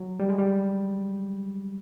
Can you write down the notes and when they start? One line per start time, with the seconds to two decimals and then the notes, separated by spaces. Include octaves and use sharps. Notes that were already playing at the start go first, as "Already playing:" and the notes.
Already playing: F#3
0.20 G3
0.29 G#3
0.38 G3